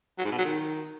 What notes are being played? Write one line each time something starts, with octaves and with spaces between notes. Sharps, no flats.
F#3
G#2
B2
F#3
D#3